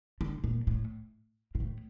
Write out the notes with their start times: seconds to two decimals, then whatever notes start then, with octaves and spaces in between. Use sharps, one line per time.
0.21 D3
0.44 A#2
0.67 A2
1.55 A#2
1.60 A2